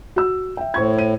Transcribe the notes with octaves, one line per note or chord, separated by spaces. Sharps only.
F#4 E6
E5 G5
A2 C5 C#6 G#6
C5 D#7